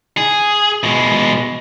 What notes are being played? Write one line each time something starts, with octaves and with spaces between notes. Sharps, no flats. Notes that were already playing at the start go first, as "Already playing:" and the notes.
G#4
B2 G#3